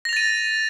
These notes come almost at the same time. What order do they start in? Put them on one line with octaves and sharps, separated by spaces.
A#6 F7 A6 D#7